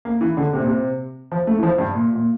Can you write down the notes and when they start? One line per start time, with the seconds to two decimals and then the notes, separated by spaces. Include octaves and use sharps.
0.05 A#3
0.21 E3
0.37 D3
0.53 C3
0.60 A#2
0.67 C3
1.32 F3
1.47 A3
1.58 E3
1.63 F3
1.78 G2
1.95 A#2
2.15 A#2